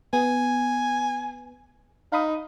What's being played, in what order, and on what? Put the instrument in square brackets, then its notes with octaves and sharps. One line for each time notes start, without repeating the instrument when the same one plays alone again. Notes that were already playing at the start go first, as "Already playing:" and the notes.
[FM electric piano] B3 [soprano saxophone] G#5
[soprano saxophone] D#4 [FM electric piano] F5 B5 D#6